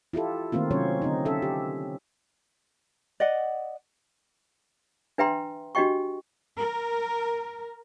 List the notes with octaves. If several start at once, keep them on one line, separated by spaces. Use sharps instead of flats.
E4 F4 G4 A4
D#3 A3 A#3 C4 F4
C3 F#3 C4 C#4 C5 C#5
D3 C4 D#4
C#4 A4 E5
G4
D5 D#5 F#5
D4 B4 E5 G5 A#5 C6
D4 F#4 G4 D#5 G5 C#6
A#4